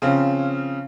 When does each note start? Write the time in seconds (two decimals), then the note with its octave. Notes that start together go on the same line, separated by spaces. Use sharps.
0.02 C#3 F3 C4 C#4